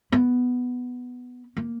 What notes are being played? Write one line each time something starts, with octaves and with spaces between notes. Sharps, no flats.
B3
A#3